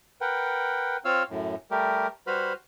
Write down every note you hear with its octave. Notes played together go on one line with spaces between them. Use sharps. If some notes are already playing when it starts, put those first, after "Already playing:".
A#4 B4 F#5 G5
C4 F4 C#5 F5 E6 F6
F#2 A2
G3 A3 G4 A#4
G3 F#4 B4 C5 B5 F6